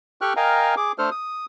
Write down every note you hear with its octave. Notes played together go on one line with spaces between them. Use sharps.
G4 A4 G5 C#6 F6 F#6
A#4 D#5 F5 G5 G#5 A#5
G#4 D6
A3 D4 A4 C5 F6
D#6